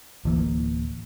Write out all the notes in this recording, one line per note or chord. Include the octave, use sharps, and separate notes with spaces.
D1 E3 A#3